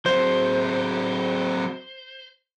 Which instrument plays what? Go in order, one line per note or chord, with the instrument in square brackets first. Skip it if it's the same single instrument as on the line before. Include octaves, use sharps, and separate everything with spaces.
[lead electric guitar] F#3 C4 [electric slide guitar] C5